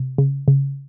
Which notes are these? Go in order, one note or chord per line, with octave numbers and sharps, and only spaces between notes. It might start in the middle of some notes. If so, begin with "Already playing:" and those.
Already playing: C3
C#3
C#3